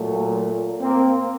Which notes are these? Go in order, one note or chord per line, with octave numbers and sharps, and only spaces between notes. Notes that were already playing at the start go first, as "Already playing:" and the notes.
Already playing: A#2 F#3 A3
A#3 C4